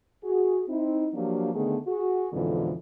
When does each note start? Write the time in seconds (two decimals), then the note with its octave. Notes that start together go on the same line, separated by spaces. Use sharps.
0.24 F#4 G#4
0.68 C4 D#4 E4
1.14 F3 F#3 A#3 D4 F4 G4
1.54 D3 D#3 A3 B3 G#4
1.87 F#4 G#4
2.33 F2 G#2 B2 D3 E3 F3